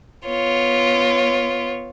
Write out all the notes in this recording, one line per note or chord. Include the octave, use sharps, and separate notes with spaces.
B3 F4 C#5